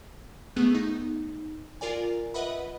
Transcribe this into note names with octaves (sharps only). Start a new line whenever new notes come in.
A3 B3 G#4 F#6
D#4
F4 A#4 D5 G#5
B4 D#5 E5 F#5 B5